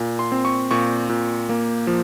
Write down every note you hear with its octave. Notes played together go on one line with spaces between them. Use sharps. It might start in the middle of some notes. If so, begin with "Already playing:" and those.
Already playing: A#2
C6
C4
C#6
A#2 C#6
A#2
A#3
F3